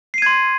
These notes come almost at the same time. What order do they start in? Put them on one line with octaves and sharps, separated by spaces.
C7 D#7 G#6 C6